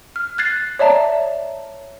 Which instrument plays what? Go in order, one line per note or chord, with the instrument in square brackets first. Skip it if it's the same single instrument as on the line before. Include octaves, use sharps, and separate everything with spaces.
[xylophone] F6
F#6 G#6 A6 C7
C#5 D5 E5 A5 A#5